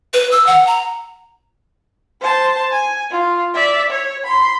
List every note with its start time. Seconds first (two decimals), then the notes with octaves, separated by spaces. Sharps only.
0.13 B4
0.31 E6
0.46 F#5
0.67 A#5
2.20 C5 A5
2.72 G#5
3.11 F4
3.55 D5 E5
3.90 C#5
4.24 B5 C6